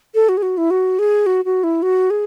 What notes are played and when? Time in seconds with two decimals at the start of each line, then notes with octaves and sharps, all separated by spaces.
0.15 A4
0.29 F#4
0.37 G#4
0.42 F#4
0.58 E4
0.70 F#4
0.99 G#4
1.26 F#4
1.45 F#4
1.64 E4
1.82 F#4
2.10 G#4